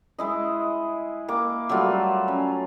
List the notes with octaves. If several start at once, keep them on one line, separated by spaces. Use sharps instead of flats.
G#3 E4 D#5
A#3 D6
F#3 G3 A3 F4
C#4